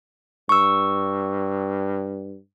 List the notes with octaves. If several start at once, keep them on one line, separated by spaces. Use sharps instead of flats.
G2 C#6 E6